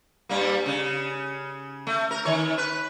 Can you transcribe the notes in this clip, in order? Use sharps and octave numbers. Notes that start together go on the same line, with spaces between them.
G2 G3 A#3
C#3
A3
A#4
D#3 C#5
B4